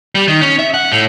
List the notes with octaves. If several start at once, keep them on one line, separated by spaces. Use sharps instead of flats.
G3
D#3
C#4
E5
F#5
A2